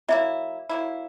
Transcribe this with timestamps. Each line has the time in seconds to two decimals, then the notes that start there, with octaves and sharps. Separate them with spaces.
0.08 F#3 A#3 E4 E5
0.69 F#3 A#3 E4